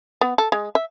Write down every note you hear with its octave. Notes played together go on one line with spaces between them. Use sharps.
B3
A4
G#3
E5